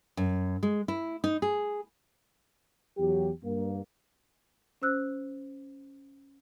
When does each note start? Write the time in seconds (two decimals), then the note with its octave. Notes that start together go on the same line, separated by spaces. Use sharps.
0.17 F#2
0.63 G#3
0.88 E4
1.24 D#4
1.42 G#4
2.98 E2 F#3 G4
3.44 G2 A#3
4.82 C#4 C5 E6 F#6